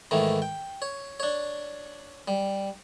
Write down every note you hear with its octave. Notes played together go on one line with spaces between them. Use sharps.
G#2 D#3 E3 A3
G5
C#5
D4 C#5
G3